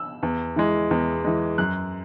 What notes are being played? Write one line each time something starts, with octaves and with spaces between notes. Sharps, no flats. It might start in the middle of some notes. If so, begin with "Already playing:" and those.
Already playing: E6
E2
E3 G#3
E2
E3 G#3
F#2 F#6